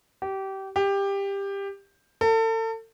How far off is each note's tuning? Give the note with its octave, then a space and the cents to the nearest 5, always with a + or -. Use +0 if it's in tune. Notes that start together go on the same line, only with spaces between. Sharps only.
G4 -25
G4 +15
A4 +35